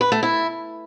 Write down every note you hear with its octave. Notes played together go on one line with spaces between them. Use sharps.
B4
A3
E4